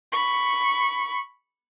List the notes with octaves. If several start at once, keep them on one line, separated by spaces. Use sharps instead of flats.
B5 C#6